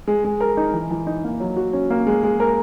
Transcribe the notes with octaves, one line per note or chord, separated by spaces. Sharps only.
G#3
G#3
A#4
D#4
E3
E3
D#4
A#3
F#3
F#4
C#4
A#3
G#3
G#3
A#4